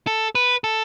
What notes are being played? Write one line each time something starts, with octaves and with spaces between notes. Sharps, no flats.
A4
B4
A4